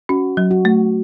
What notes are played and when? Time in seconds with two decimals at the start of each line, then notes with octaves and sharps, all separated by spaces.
0.09 C#4 F#4
0.37 F#3
0.51 F#4
0.65 A3